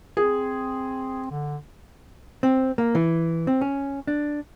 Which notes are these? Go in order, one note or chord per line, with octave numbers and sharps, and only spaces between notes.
C4 G#4
D3
C4
A#3
E3
C4
C#4
D4